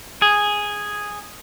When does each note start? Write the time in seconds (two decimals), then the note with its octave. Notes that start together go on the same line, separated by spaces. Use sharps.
0.22 G#4